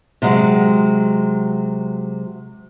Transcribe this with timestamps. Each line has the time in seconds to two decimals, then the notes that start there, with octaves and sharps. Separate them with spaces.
0.22 C3 F#3 G#3